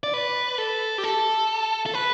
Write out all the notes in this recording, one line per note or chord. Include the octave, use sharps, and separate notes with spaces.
D5
B4
A4
G4
A4
A4
B4